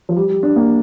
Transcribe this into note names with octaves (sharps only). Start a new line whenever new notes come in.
F3
G3
G3
D4
A#3